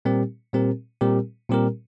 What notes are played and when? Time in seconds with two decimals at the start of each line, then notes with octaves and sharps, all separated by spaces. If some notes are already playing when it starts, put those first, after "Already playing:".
0.05 A#2 G3 C4 G4 A#4
0.53 A#2 G3 C4 G4 A#4
1.01 A#2 G3 C4 G4 A#4
1.49 A#2 G3 C4 G4 A#4